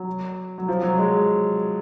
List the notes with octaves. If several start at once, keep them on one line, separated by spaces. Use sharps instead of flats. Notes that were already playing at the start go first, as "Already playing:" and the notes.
Already playing: F#3
F#3
F3
F#3
G#3